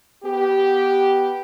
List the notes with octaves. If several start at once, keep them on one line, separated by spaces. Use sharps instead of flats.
B3 G4